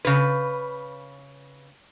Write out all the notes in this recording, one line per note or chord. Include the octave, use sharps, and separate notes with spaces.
C#3 B4